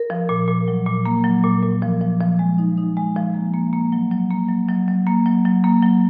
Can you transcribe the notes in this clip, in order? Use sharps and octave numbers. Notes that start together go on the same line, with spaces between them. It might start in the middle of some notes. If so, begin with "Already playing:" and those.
Already playing: A#4
F3
A#2
A#2
F#3
A#2
A#3
F#3
A#2
A#2
F3
F3
F3
G#3
D#4
D#4
G#3
F3
A#3
A#3
A#3
F#3
F#3
A#3
F#3
F#3
F#3
A#3
F#3
F#3
A#3
F#3